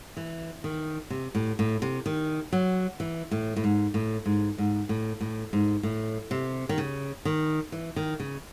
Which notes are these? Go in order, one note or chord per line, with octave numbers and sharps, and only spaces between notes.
E3
D#3
C3
A2
A2
C3
D#3
F#3
E3
A2
A2
G#2
A2
G#2
G#2
A2
A2
G#2
A2
C3
D#3
C#3
D#3
E3
D#3
C#3